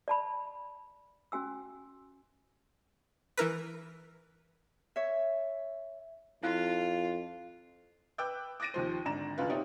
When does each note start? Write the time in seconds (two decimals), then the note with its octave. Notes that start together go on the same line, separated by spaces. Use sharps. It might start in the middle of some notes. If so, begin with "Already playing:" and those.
0.08 D5 A5 B5
1.32 C#4 F#4 G#5 E6
3.37 E3 E4 A#4 B4
4.96 C#5 E5
6.43 F2 E4 F4 F5 F#6
8.18 B4 G5 D6 E6 F#6 G6
8.60 D6 F#6 A6 A#6 D7 D#7
8.74 D#2 F3 C5
9.05 G#1 D3 D5 A#5 E7
9.38 F#1 D2 F4 B4
9.50 C4 D#4 G4 C#5 D5 E5